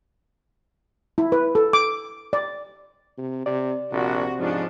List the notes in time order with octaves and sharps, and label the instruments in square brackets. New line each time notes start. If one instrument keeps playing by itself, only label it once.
[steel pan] E4
B4
A4
D6
D5
[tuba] C3
[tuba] C3 [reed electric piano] D5
[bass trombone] A#1 [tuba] C3 [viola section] F#4
[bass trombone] G#2 [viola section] F3 C#4 D4